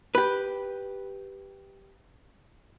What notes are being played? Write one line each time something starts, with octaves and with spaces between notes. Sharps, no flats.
G4 B4